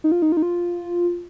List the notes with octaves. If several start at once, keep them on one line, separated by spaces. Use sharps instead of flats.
D#4
F4
D#4
F4
D#4
F4